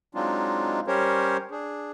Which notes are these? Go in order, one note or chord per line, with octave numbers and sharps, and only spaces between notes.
F#3 G#3 C4 D4 D#4 F4
G3 C#4 G4 A#4 C5 C#5
D4 G#4